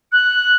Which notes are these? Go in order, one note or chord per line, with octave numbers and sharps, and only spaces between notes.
F#6